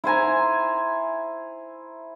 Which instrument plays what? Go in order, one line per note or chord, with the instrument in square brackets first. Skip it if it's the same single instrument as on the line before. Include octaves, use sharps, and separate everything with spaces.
[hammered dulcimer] E4 C5 G#5 A#5